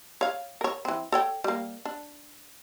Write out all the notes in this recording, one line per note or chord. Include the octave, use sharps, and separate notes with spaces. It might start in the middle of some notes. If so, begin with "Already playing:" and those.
C#5 F5
A#4 C#5
E3 C4
A4 C#5 G5
G3 A#3
D4